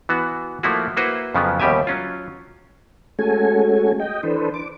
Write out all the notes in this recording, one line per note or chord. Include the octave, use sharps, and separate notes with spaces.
E3 B3 F#4
F3 A3 A#3 E4 F#4
A#3 E4 F#4 B4 C5
F2 C#3 F3 F#3 B3
D#2 B2 G3 G4 E5 G#5
F#3 C#4 F4
G#3 A3 C#4 F#4 A4 G#5
D#5 G5
E3 D4 A4 B4 C5
D6